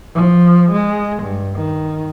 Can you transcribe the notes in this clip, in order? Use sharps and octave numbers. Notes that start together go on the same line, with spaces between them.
F3
G#3
G2
D#3